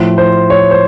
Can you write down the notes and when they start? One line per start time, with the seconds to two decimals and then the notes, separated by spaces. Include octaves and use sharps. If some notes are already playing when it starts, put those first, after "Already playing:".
Already playing: A2 F3
0.18 C5
0.50 C#5
0.71 C5